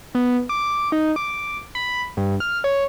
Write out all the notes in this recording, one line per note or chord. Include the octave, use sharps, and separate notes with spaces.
B3
D6
D#4
D6
B5
G2
F6
C#5